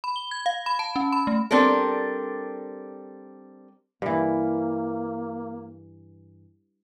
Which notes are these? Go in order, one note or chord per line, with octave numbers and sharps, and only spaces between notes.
B5
G7
G#6
F5
B5
A5
C#4
B5
A3
G3 C4 D4 A4 A#4
G2 E3 A#3